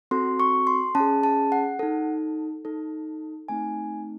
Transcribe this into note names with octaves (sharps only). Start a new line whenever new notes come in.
C4 F#4 A4 C6
C#6
C6
C#4 A5
G#4
A5
F#5
D#4 A4
D#4 A4
A3 C4 D#4 G#5